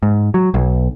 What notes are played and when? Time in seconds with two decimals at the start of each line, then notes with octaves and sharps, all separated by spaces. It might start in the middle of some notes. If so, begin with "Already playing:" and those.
0.03 G#2
0.34 F#3
0.54 B1